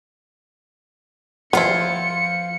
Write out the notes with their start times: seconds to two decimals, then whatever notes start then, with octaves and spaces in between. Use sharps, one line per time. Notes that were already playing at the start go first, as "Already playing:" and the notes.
1.53 F3 B3 E4 F4 C5 G#6 C#7